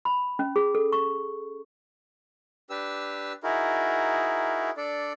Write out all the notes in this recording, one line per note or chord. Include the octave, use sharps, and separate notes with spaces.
B5
C#4
G#4
A4
C#6
D4 G4 B4 E6
D#4 E4 F#4 G#4 A#4
D4 A4 D5